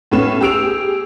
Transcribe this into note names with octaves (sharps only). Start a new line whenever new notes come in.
A2 B3 C#4 E7
G4 G#4 E6 D7 F7